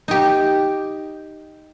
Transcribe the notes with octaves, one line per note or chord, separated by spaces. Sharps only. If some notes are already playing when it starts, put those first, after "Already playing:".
D#4 G4